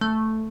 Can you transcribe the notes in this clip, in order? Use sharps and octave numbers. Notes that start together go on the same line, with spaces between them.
A3